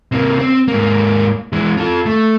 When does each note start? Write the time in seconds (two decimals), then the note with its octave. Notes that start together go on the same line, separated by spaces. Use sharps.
0.12 C3 A#3
0.39 C4
0.68 G#2 A#3
1.53 E3 G#3
1.77 F4 A4
2.06 A3